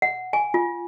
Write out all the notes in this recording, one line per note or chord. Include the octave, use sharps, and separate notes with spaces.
F#5
G#5
F4